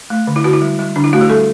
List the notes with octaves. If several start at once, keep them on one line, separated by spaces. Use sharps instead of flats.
A3
D3
E4
D3 F#4
E4
G3
G3
D3 D4
E4
A3 F#4
G4
G3 A4